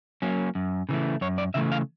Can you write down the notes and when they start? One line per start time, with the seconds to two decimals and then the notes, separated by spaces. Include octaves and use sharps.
0.22 F#3 A#3 C#4
0.55 F#2
0.89 C#3 E3 A3
1.21 F#2 C#5
1.38 D5
1.54 C#3 E3 A3 E5
1.72 F5